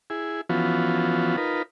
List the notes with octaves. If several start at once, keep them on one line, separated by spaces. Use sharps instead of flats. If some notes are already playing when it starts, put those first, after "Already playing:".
E4 G#4
E3 F3 B3 C#4 F4 F#4
D#4 F4 A#4 B4